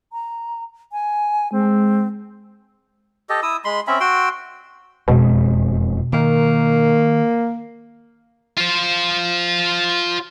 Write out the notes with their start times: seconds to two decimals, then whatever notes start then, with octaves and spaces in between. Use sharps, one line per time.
0.13 A#5
0.92 G#5
1.52 G#3 C4
3.29 G4 A4 D#5
3.43 E4 D#6 E6
3.65 G#3 B5 C6
3.87 C4 C#4 E5 B5
4.00 F#4 G5 C6 E6
5.08 E1 F2 B2 G#3
6.13 D#3 A#3
8.57 F4 C5